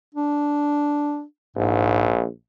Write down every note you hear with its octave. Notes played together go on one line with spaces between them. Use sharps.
D4
A#1 G#2